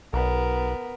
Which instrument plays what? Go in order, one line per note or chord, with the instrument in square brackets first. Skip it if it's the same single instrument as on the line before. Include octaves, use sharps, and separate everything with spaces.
[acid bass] B1 [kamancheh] B3 A#4